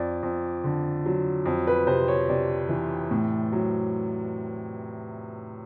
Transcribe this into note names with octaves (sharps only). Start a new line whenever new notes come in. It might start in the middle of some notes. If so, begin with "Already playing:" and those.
Already playing: F2 D5
F2
D3
F#3
F2
B4
C3 C5
C#5
C3 D5
E3
A2
F#3